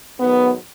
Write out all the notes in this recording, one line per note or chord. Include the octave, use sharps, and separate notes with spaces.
G#2 D#3 F#3 B3